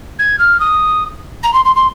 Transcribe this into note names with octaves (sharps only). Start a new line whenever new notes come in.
G#6
F6
D#6
A#5
C6
C6
C6